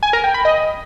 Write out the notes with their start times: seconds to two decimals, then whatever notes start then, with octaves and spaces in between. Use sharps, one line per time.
0.03 G#5
0.13 A#4
0.24 G5
0.34 B5
0.45 D#5